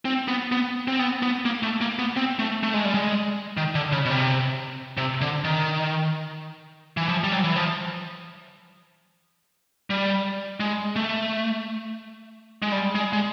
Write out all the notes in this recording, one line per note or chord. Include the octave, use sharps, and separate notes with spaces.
C4
B3
B3
C4
B3
B3
A#3
A3
A#3
B3
C4
A3
A3
G#3
G3
G#3
D#3
D3
C#3
B2
C3
C3
D3
D#3
E3
F3
G3
F#3
E3
F3
G3
G#3
A3
G#3
G3
G#3
G#3